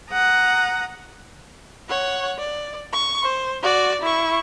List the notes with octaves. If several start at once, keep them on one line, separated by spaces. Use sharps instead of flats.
F#5 A#5 D#6
C#5 F#5
D5
C#6
C5
F#4 D5
E4 C#6